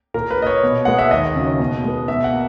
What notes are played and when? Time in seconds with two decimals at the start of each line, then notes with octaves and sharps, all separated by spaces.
0.14 A#2 A#4
0.31 B4
0.39 A#3 D#5
0.47 C#5
0.63 B2
0.85 G#3 B3 F#5
0.99 E5
1.11 D#2 D#5
1.36 C#3 F#3
1.59 B2
1.84 G#3 B3
2.08 B2 E5
2.24 F#5
2.32 A#3